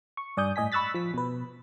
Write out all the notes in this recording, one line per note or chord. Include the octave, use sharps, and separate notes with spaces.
C#6
G2 D5 G#5 D#6 G6
A2 D#5 G#5 B6
B5 C#6 E6 F#6 A6 B6
F3 B6
B2 B4